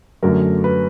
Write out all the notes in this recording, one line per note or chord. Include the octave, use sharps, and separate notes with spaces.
F#2 D3 F#3 A3 A#4
B4